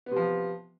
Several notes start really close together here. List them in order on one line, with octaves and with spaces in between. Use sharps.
B3 C3 F3